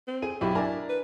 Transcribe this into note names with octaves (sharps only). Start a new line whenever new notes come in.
C4
G#4 D#7
B1 E4 F#4 G4 B5
D4 A#4 D5 E5 G#5 A#5
B4